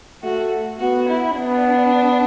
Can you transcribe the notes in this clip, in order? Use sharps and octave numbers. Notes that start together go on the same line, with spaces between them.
A3 F#4
B3 F#4
E4
B3 D4